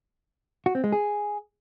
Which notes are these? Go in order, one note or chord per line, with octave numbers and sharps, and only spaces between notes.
F#4
C4
G#3
G#4